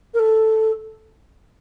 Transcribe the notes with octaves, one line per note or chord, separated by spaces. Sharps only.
A#4
A4